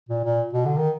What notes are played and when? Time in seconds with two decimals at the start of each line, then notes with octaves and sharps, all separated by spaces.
0.09 A#2
0.25 A#2
0.53 B2
0.65 D3
0.77 D#3